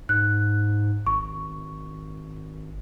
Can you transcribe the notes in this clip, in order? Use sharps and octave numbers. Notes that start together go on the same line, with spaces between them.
G#2 F#6
G#1 C#6